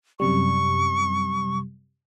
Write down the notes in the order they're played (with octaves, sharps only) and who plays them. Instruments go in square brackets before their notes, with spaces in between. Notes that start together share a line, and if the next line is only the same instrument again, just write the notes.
[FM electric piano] F#2 C3 G3 [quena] C#6